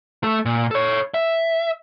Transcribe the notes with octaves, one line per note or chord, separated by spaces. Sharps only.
A3 A4
A#2
A4 C#5
E5